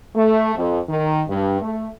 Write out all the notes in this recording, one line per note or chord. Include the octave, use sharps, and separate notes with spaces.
A3
F2
D#3
G2
A3